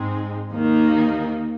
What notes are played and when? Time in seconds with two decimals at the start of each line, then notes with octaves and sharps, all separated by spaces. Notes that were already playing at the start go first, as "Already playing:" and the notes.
Already playing: G#2 G#3 C4 D#4
0.51 D#2 D#3 A#3 D#4